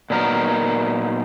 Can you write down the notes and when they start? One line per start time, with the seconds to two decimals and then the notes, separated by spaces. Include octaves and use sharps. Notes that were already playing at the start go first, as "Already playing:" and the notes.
0.10 A#2 F#3 B3 D#4 A#4